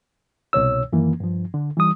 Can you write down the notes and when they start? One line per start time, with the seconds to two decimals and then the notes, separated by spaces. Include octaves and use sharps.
0.53 C2 B2 C#5 E6
0.93 F#2 D#3 E3 A#3
1.20 G2 F3
1.54 D3
1.77 E3 G3 D#6